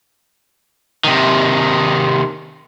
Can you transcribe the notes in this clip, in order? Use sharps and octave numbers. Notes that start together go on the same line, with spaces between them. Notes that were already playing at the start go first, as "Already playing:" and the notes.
C3 D#3